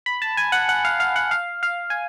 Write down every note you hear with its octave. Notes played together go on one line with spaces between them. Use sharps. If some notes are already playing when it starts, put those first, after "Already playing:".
B5
A5
G#5
F#5
F#5
F5
F5
F#5
F5
F5
G#5